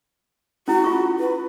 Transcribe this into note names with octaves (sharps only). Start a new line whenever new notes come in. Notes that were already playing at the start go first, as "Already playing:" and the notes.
C#4 E4 F#4
F4 C#6
E4 B4